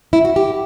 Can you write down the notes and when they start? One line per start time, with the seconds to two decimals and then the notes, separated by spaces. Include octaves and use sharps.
0.13 E4
0.25 F#4
0.36 G4